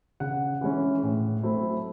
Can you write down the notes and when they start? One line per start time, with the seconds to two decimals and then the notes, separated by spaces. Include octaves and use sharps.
0.20 C#3 F#5
0.61 E3 G#3 C#4
1.03 A2
1.43 F#3 A3 C4 E4